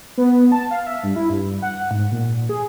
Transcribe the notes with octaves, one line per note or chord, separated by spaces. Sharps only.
B3
A5
F5
E5
G2
E4
G2
F#5
G#2
A#2
G#4